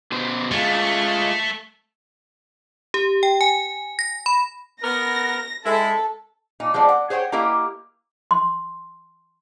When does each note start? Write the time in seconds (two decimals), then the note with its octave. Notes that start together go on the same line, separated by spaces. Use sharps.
0.12 B2 B3 C5
0.51 G#3 A3 F4
2.94 G4
3.23 G5
3.41 G#5
3.99 A#6
4.26 B5
4.83 B3 A#4 A#6
5.64 G#3 E4 A4
6.60 A#2 D#4
6.74 F3 G#3 B3 C4 D5
6.89 F#5
7.10 G#4 C5 C#5 F#5 G5
7.32 A#3 E4 G4 A#4 D#5 F5
8.31 C6